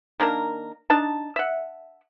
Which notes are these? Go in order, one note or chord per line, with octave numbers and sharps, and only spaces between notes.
D#3 A#3 D4 A#4
D4 D#4 A5
E5 F#5